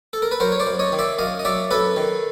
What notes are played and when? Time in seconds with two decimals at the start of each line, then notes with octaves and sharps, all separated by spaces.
0.13 A4
0.22 A#4
0.31 B4
0.40 F#3 A#4 C5
0.52 C#5
0.60 C5 D5
0.67 F#2
0.79 C#5 D#5
0.92 D#3
0.99 D5 E5
1.19 F#2 D#5 F5
1.39 D#5
1.45 F#3 D5 E5
1.71 F#2 A4 B4
1.96 D#3